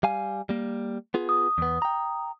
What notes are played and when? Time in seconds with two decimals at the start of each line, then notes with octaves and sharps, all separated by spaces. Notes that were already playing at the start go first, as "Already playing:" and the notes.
0.03 G3 F5 G#5
0.49 G3 A#3
1.14 B3 F4 G#4
1.29 D#6
1.58 E2 B3
1.82 G5 A#5